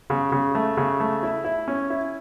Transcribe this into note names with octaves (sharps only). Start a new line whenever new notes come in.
C#3
C#3
A3
C#3
A3
E4
E4
C#4
E4